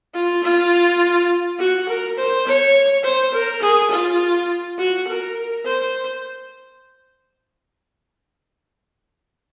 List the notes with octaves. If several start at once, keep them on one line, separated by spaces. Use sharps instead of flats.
F4
F4
F#4
A#4
C5
C#5
C5
A#4
G#4
F4
F#4
A#4
C5